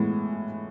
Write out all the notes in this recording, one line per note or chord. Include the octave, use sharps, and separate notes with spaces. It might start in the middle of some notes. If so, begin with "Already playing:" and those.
Already playing: A2 E3 G#3 B3